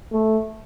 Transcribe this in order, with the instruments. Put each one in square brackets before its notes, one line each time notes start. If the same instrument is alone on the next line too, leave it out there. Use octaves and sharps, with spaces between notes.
[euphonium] A3